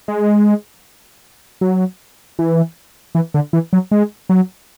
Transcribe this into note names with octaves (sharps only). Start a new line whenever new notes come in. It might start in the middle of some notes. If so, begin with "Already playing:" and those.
G#3
F#3
E3
E3
D3
E3
F#3
G#3
F#3